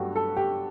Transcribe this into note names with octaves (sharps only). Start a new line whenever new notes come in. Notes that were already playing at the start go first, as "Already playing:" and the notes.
Already playing: G2 F#3 A3 F#4 G4 A4
A4
G4